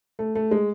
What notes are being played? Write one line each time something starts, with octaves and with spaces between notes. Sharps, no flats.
A3
A3
G#3